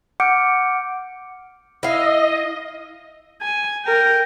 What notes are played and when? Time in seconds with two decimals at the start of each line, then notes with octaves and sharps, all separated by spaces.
0.20 F#5 D6 F6 G6 C#7 D7
1.83 E4 D#5 F5
3.42 G#5
3.85 A#4 G5